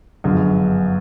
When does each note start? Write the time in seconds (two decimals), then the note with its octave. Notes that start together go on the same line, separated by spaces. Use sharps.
0.24 G1 F#2 D3 F3 G#3